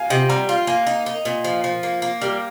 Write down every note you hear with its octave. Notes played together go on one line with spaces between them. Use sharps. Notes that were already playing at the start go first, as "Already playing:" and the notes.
Already playing: F5 G#5
C3 D#5 G5
G3 G5 A#5
F4
A#3 F5 G#5
D#4
D#4
A#2
F3
F3
A#3
A#3
G3 G4 A#4